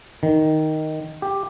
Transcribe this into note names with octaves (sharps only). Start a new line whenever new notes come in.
D#3
G4